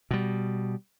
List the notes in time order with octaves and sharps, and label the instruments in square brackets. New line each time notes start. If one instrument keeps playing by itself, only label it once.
[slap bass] B2 G3